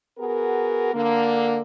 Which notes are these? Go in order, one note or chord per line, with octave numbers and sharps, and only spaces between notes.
B3 F#4 G#4 A#4
D3 A#3